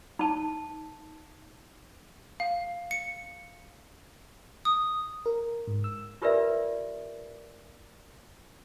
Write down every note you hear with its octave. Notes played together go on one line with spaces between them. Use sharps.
D#4 A5
F5
C#7
D#6
A#4
G#2
E6
F4 G4 A#4 B4 D5 E5